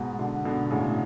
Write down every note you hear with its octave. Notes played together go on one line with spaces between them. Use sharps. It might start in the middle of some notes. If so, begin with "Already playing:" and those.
Already playing: G#2 B2
B2 D3
B2 D3
A2 C#3